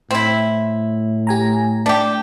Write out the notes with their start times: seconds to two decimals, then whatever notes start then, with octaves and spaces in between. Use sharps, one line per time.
0.11 A2 C4 E4
1.27 G4 G#5 A#5
1.86 A3 D4 G4